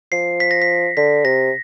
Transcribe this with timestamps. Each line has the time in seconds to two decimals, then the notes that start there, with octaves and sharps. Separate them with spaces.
0.12 F3 C7
0.40 B6
0.51 A#6
0.62 B6
0.97 D3 B6
1.25 C3 A#6